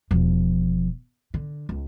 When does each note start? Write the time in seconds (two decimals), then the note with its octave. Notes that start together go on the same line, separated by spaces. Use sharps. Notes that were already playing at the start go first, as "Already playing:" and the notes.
0.11 E1 F3
1.34 D3
1.69 C#2